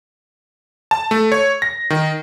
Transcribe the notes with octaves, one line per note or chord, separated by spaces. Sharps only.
A5
A3
C#5
A#6
D#3